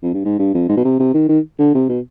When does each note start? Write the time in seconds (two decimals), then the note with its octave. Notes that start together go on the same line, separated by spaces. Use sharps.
0.03 F2
0.14 G2
0.25 G#2
0.39 G2
0.54 F2
0.69 G#2
0.77 B2
0.85 C3
1.00 C3
1.14 D#3
1.29 D#3
1.59 D3
1.75 C3
1.89 B2